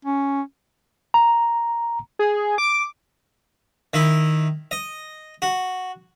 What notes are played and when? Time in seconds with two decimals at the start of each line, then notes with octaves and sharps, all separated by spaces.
0.05 C#4
1.14 A#5
2.19 G#4
2.58 D6
3.94 D#3 E4
4.71 D#5
5.42 F#4